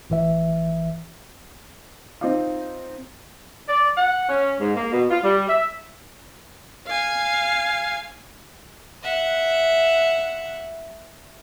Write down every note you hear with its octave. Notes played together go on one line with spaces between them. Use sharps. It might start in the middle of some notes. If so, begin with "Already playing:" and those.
A1 E3 E5
C4 D#4 F4
D5
F#5
C#4
G#2
A#3
B2
F4
G3
E5
F5 G#5
E5 F#5